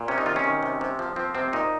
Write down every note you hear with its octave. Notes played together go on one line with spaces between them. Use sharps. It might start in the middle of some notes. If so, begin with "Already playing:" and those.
Already playing: A#2
C3 C#4
D#4
D#3 F4
C#4
D#3
C3
C3
F3
F3 C4
C3 C4
A#2 D#4